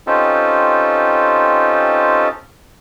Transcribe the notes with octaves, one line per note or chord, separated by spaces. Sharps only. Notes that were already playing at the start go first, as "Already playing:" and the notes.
C4 C#4 D#4 F4 G4 A4